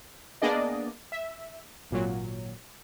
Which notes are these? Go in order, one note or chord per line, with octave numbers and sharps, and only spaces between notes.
A#3 B3 D4 G#4 D5 D#5
E5
G#1 A#2 F#3